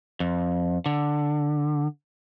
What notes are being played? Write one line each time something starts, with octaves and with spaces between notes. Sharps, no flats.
F2
D3